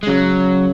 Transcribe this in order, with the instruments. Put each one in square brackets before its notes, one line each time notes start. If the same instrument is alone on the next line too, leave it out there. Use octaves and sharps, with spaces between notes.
[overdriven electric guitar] G#3
[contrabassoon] C#3 [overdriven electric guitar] F#3